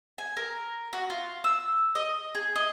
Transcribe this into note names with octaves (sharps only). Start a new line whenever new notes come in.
G#5
A#4
F#4
F4
E6
D#5
G#4
D#5